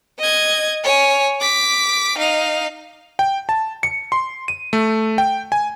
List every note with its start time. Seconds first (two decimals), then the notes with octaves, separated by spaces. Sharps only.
0.19 D#5 G#6
0.84 C#5 G#5
1.41 D6 B6
2.18 D#4 F5
3.19 G5
3.49 A5
3.83 C#7
4.12 C6
4.48 D#7
4.73 A3
5.18 G5
5.52 G#5